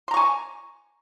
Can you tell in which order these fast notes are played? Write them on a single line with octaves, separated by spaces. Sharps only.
C6 A#5 C#6 G#5